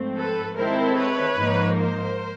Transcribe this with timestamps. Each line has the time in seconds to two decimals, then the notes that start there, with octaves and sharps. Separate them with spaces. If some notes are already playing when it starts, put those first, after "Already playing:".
Already playing: G#2 F3 A3 C4
0.17 A4 B4
0.56 D#3 G#3 C4 E4 A4 A#4 C5
0.96 B4 C#5
1.36 G#2 F3 A#3 D#4
1.76 A#4 C5